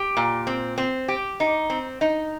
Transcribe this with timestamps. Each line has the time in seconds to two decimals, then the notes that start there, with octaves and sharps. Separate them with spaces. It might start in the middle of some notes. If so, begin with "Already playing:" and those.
Already playing: G4
0.17 A#2
0.47 C4
0.78 C4
1.08 G4
1.40 D#4
1.70 C4
2.01 D#4